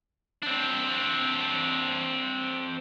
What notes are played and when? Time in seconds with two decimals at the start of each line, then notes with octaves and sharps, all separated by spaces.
0.42 C4 D4